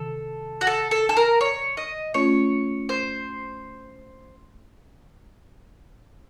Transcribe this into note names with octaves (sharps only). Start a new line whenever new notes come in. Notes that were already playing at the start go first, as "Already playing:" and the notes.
Already playing: C3 D#3 A4
F#4
A4
A4
A4
A#4
C#5
D#5
A3 C#4 F4 C#5
C5